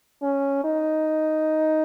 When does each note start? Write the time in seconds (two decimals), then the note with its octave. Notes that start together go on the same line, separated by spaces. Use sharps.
0.22 C#4
0.64 D#4